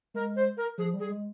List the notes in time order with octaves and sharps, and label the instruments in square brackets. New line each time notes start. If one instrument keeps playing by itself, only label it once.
[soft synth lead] G#3 [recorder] A#4
[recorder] C5
A#4
[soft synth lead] F3 [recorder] G#4
[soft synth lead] G3
[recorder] G#4
[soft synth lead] G#3